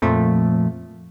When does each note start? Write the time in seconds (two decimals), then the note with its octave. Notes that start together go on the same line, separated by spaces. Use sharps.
0.02 F2 A#2 F3 A3